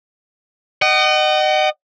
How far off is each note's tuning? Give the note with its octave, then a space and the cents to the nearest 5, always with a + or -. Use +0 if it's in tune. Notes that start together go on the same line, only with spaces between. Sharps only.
D#5 -25 F#5 +40